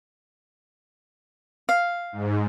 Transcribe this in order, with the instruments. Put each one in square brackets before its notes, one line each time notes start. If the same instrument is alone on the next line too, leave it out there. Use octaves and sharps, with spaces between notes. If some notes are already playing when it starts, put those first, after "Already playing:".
[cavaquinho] F5
[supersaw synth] G#2